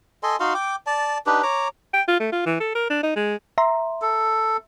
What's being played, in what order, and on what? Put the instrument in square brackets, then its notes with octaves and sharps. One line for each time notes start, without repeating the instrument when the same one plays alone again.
[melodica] A4 D#5 G#5 C6
D#4 F#4 F5 C6
G5 D6
D5 A5
D4 D#4 G4 B4
C#5 A#5 D6
[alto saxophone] G5
F4
A3
F4
E3
A4
A#4
D4
D#4
G#3
[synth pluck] E5 A#5 C6
[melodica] A4